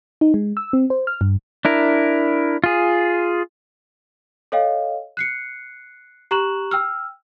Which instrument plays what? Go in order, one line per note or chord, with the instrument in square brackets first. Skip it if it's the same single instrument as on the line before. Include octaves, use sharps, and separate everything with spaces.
[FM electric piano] D#4
G#3
E6
C4
C5
F6
G2
[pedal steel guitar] D4 E4 A#4
F4 G#4
[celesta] A4 C#5 D#5 F5 G5
F#6 C7 C#7
G4 A#5 C#6 F#6 E7 F#7
G5 E6 F6